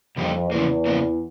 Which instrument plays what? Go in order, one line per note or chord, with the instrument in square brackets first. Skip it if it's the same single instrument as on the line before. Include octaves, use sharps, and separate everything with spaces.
[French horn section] F2 [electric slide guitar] D3 G3 A#3 D#4 G4
[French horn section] E2 [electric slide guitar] C#3 F3 A#3
[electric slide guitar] C#3 F3 A#3